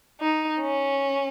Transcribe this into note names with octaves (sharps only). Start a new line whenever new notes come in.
D#4
C#4